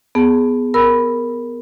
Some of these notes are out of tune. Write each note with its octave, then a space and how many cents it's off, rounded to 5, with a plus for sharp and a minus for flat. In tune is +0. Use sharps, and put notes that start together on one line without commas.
B3 +5 G#4 +0 A5 +5
A#4 +0 B5 +0 E6 +0